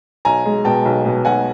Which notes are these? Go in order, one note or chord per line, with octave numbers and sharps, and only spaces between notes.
B1 G#5 A#5
G#3
B2 G5 A5
B1
B2
B1 F#5 G#5